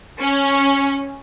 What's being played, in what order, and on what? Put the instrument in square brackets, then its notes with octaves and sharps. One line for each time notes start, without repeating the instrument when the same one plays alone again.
[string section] C#4